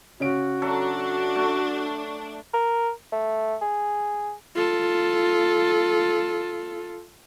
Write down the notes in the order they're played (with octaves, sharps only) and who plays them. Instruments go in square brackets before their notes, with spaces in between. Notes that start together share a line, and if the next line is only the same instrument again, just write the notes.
[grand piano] C#3 C#4 D7 [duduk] F#4
[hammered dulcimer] F#3 A4 E5 [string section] D4
[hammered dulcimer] A3
[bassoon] A#4
A3
G#4
[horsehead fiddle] F4 A4